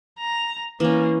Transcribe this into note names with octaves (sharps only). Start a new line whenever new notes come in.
A#5
E3 A#3 C#4